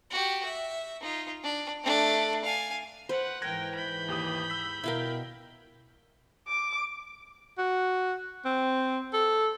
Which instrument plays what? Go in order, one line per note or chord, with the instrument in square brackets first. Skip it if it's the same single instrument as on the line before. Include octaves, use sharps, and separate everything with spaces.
[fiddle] F#4 G4
E5
D#4 F4
D4
A3 D4
F5 G#5
[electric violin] B4 F#5 [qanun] C5
[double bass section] G#2 E3 [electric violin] A#4 G5 [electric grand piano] F#6 G#6 A#6
[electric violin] B5 G6
[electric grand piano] D#2 G4 D#6
E6 B6
[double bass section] B2 [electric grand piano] E4 A#4 [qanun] E5 F5 G5
[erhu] D6
[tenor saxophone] F#4
C4
A4